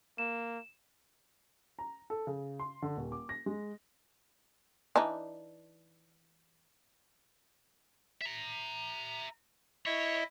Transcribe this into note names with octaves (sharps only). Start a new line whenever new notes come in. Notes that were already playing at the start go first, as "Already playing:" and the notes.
A#3 E7
A#5
A4
C#3
C6
D3
D#1
D6
A#6
G#3
E3 D4 D#4
E5 A#5
E4 C#5 D#5 E5